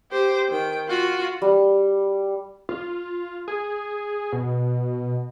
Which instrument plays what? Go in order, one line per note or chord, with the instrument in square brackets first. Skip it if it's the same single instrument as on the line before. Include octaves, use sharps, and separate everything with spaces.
[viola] G4 C5
D#3 G5
F4 F#4
[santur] G3
[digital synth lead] F4
G#4
B2